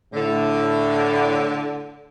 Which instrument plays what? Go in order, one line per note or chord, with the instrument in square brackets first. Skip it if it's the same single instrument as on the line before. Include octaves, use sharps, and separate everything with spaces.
[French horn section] A2 [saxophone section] D3